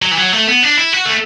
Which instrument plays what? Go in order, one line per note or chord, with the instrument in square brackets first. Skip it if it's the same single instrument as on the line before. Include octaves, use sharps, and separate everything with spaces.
[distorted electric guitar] F#3
E3
F#3
A3
B3
D4
E4
F#4
A3